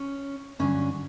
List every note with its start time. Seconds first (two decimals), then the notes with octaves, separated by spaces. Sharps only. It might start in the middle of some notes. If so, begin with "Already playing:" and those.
Already playing: C#4
0.59 G2 D3 F#3 C#4